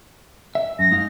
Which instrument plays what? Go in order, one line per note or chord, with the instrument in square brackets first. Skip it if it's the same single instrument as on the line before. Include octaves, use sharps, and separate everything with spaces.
[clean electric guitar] E5
[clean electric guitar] F#2 [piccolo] A#6
[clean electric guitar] G#3 D#4 F5